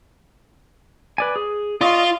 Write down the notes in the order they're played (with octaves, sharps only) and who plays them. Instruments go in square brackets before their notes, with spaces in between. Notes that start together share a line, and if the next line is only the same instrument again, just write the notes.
[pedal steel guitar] B4 D5 G#5
G#4
[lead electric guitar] F4 [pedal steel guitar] D5 D#5 C#6